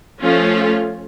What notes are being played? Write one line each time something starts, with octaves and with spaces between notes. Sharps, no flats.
F3 A3 C#4 F4